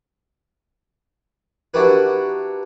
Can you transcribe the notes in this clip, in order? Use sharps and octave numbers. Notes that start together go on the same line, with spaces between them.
D4 E4 F#4 G4 A#4 B4